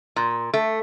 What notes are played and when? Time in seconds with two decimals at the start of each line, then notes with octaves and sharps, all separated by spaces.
0.16 A#2
0.54 A3